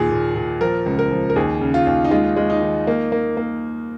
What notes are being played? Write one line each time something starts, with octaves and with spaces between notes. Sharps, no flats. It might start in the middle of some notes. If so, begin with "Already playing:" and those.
Already playing: D#2 A#2 G#4
A#2
A#2
F3 A#4
C#2
A#4
F3
A#4
D#2 G#4
C#3
F4
D#2
D#4
G#3 F4
G#3
D#4
D#3
A#3
A#3
A#3